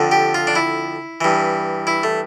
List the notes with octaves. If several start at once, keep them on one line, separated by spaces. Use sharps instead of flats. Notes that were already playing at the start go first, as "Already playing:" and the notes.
Already playing: F2 D3
G4
F4
D4
E4
G2 E3
E4
A3